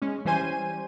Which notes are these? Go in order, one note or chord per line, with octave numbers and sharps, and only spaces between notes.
G#3 C#4
E3 G3 C#4 C5 G#5 D#7